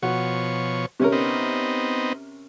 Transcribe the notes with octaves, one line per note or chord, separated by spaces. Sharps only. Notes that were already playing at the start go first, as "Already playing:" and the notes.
B2 F3 F#4 C#5
C3 C#4 A#4
B3 C4 D#4